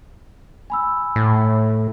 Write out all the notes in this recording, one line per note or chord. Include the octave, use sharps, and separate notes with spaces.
G#5 B5 E6
A2